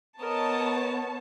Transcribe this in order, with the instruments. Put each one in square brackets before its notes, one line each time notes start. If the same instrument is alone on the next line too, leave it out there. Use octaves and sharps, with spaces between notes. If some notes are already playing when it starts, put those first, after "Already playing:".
[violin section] B3 C#5 A5 [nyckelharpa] A#4 D#5